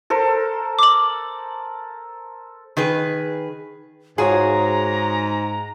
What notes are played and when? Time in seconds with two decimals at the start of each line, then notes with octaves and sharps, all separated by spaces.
0.10 A4 A#4 C5
0.79 D6 F#7
2.77 D#3 G#4 B4
4.18 G#2 F4 F#4 G#4 C#5 A#5